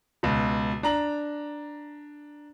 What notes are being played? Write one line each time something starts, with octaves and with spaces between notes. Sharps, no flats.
C#2 B2
D4 A#5 F#7